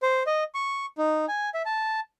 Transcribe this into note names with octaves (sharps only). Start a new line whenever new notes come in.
C5
D#5
C#6
D#4
G#5
E5
A5